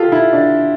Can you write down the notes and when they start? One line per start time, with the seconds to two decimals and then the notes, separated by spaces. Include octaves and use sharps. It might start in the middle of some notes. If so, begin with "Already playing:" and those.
Already playing: F4 G4 A4
0.12 E4
0.33 D4